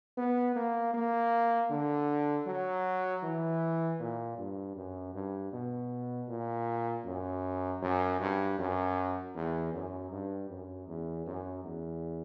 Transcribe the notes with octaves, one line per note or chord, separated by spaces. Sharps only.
B3
A#3
A#3
D3
F#3
E3
A#2
G2
F#2
G2
B2
A#2
F#2
F#2
G2
F#2
E2
F#2
G2
F#2
E2
F#2
E2